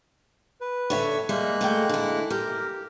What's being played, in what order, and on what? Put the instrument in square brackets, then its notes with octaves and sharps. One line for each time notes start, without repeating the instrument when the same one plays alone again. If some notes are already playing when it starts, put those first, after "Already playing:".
[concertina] B4
[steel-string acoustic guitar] D3 C#5 E5
[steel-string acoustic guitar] G3 E5 [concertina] G#3 A#3 F#6
[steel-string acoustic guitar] A3 F#4 G5
D3 E4
[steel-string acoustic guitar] G4 [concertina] A#4